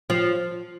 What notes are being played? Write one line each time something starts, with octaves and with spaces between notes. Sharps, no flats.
F3